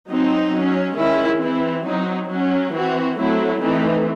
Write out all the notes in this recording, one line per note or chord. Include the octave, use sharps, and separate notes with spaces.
F#3 C4 D#4
F#3 C#4
D#3 G#3 C#4 E4
E3 C4 E4
F#3 C4 D#4
F#3 C#4
E3 C4 F#4
F#3 A3 C4 E4
E3 A3 C4 D#4